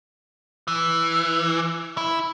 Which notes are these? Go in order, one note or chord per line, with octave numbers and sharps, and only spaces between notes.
E3
E4